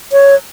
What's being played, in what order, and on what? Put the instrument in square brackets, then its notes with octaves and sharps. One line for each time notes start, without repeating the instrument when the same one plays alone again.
[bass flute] C#5